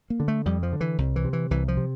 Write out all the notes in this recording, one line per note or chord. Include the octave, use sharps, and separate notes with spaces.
A#3
D3
A3
F2 G3
F3
D3
E3
C2
E3
C3
E3
C2 E3
F3
C3